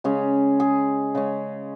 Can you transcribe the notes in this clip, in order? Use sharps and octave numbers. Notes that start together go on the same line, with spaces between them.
C#3 G#3 C#4 G#4
G#4
C#3 G#3 C#4